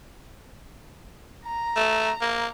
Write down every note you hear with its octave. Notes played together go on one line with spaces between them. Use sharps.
A#5
A3
A#3